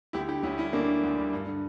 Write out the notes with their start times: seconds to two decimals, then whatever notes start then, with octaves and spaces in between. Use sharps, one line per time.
0.13 D2 E4 G4
0.28 D3 E4 G4
0.43 D2 C#4 E4
0.58 G3 C#4 E4
0.73 D2 A#3 D4
0.88 D3
1.03 D2
1.18 G3
1.33 G2
1.47 D3